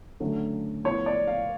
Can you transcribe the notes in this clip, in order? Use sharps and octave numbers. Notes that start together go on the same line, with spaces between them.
D3 F#3 A3 C#4
A2 F3 B3 C#5
D5
F5